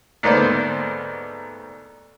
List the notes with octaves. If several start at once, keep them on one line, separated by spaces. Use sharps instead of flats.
D2 G#2 A#3 B3 C5 D5